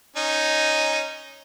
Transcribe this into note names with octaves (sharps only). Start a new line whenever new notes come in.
C#4 D#4